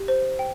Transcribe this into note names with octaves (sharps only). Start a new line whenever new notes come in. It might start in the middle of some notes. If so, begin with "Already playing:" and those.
Already playing: G4
C5
G5